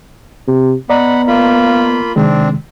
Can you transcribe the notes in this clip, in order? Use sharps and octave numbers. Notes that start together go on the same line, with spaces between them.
C3
B3 D5 D#5 F#5 A#5 B5
A#3 F4 B5
C3 D#3 G#3 C4 D4